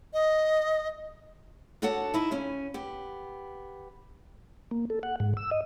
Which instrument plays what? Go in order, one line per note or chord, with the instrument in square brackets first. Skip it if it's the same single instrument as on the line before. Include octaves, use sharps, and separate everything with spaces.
[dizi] D#5
[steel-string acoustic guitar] D4 F#4 A4 C#5 F#5 A5
D#4 E4 E5
C#3 C#4 G#5
B3 G4
[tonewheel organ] A#3
A4
F#5
G#2
E6
D#5